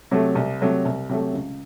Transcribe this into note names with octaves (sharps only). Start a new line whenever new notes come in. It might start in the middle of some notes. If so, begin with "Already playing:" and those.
C3 F#3 A3
C2
C3 F#3 A3
C2
C3 F#3 A3
C#2